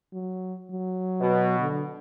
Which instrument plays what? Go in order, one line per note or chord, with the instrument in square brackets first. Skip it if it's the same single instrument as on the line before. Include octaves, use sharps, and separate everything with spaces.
[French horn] F#3
F#3
[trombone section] B2
[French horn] D3